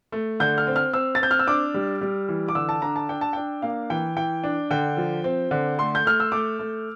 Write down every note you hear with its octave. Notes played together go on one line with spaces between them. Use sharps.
A3
D3 G6
F6
C4
F6
C4 E6
A6
C4 G6
F6
E6
D4 D6
G3
G3
E3
D6
D3 E6
A5
D4 A#5
A5
D4 G5
A5
D4 G5
A#3 F5
E3 G5
E3 G5
D4
D3 G5
F3
C4
D3
A3 C6
G6
A3 F6
E6
A3 D6
A3